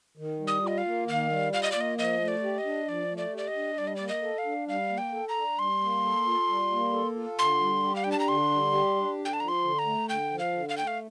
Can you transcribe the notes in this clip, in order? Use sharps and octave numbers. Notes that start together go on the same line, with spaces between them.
D#3
G3
D#6
F4 D#5
F5
A#3
D#3 F5
G3
F4 F5
D#5
A#3 D5
D#5
F3 D#5
A3
D5
G4
D#5
D4
F3 D5
A3
D5
G4 D5
D#5
D4
G3 D5
D#5
A#3 D5
D#5
A4
F5
D4
G3 F5
A#3
G5
A4
A#5
D4
G3 C6
A#3
A4
F4
G3
A#3
A4
F4
D3 C6
G3
G4
F5
D4 G5
A5
A#5
D3 C6
G3
G4
D4
D3
G5
A5
F3 A#5
C6
D3
A#5
A3
D3 G5
F3
F5
D3
F5
A3 G5
F5